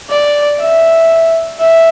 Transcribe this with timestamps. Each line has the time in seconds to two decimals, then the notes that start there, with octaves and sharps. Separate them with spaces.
0.10 D5
0.60 E5
1.60 E5